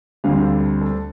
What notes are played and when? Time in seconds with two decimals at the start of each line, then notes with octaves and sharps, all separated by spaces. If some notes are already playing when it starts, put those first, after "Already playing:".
0.24 D2 D3 G3 C4 F5
0.42 A4
0.81 A4